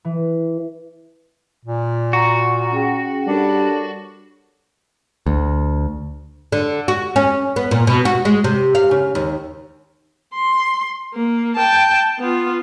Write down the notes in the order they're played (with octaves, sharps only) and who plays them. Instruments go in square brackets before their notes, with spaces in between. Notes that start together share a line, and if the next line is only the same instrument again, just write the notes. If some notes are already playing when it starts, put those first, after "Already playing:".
[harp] E3
[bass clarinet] A#2
[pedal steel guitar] F#4 [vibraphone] A#5
[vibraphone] C#4 G#4 G5
[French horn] G3 [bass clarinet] D4 [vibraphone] A4 A#4 C#5
[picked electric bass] D2
[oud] D3
F#4
C#4
B3
A#2
B2
F#4
G#3
C3
F5
C#3
D#2
[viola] C6
A#3
G5 A5
B3 F4